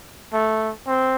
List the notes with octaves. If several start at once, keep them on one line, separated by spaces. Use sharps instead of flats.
A3
C4